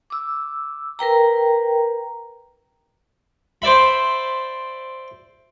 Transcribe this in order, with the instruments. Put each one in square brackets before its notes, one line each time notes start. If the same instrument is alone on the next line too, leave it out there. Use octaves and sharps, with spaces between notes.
[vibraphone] D6 E6
A#4 B4 G5 A#5
[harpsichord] C5 D5 E5 B5